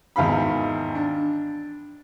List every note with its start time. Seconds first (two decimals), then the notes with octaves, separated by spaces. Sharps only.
0.16 G#1 E2 F5 B5
0.95 D4